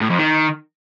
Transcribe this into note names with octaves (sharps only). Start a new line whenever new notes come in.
A2
F2
D#3